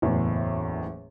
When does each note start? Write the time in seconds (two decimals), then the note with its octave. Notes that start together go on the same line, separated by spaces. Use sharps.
0.02 F#1 E2 A2